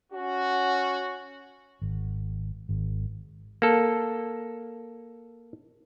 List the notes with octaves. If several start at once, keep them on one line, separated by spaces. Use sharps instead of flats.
C#4 F#4
G#1
G#1
A#3 A4